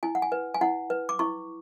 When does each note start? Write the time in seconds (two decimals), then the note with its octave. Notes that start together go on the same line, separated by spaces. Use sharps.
0.03 E4 G#5
0.15 F#5
0.22 G#5
0.32 B4
0.54 G#5
0.61 E4 F#5
0.90 B4
1.09 D6
1.19 E4 C#6